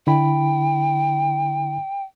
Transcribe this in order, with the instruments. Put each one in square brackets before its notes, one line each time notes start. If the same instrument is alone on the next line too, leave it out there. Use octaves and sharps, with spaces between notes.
[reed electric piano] D3 E4 B5 [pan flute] G5